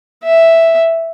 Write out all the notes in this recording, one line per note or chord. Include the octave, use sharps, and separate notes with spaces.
E5